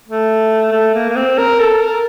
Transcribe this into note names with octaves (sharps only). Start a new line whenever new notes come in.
A3
A3
A#3
A#3
C4
A#4
A4
A#4